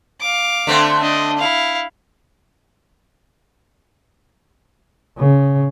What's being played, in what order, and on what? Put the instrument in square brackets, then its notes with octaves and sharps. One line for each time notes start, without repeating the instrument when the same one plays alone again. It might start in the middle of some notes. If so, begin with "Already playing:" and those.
[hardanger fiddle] F5 D6
[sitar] D3 A3 C4
[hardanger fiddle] D4 D#5
E4 F5
[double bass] C#3